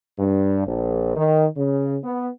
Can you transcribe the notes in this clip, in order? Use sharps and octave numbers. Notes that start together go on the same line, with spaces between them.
G2
A#1
D#3
C#3
B3